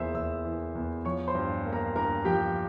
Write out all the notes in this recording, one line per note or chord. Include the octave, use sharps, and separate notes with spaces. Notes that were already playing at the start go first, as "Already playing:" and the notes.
Already playing: E2 E3 A#3 G#4 C5 E5 E6
E2 E5 E6
E3
E2
F3 C#5 C#6
C5 C6
G2
A#3
A#4 A#5
G2 A#4 A#5
F3 G4 G5